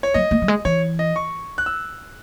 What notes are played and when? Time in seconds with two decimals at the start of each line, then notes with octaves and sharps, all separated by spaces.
0.03 C#5
0.14 F#3 D#5
0.31 A3
0.42 F#3
0.48 G#3
0.65 E3 C#5
0.99 D#5
1.16 C#6
1.58 F#6
1.66 E6